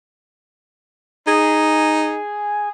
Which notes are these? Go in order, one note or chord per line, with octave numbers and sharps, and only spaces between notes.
D#4 G#4